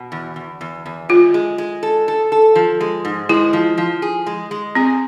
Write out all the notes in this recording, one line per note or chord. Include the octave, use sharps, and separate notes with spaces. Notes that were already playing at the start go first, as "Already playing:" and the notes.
Already playing: B2
E2
E2
E2
E2
G#3 F4
G#3
G#3
A4
A4
A4
F3
G#3
G#2
G#3 E4
F3
F3
G#4
G#3
G#3
C4 G#4